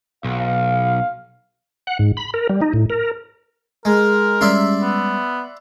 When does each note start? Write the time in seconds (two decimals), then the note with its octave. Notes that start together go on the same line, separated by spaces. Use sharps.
0.24 B1 F5
1.87 F#5
1.99 G#2
2.17 B5
2.34 A#4
2.49 G3
2.62 D#4
2.74 A2
2.90 A#4
3.85 G#3 A#4
4.41 G3 G#3 C#4 D5 E5 C6
4.80 B3